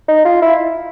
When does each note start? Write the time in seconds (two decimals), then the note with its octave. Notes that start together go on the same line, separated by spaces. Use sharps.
0.08 D#4
0.25 F4
0.42 E4